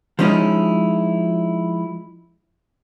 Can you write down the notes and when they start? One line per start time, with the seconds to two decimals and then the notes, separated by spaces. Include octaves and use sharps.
0.19 F3 G#3 C#4 D#4 E4